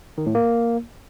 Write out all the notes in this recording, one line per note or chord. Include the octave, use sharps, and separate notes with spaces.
D#3
A2
A#3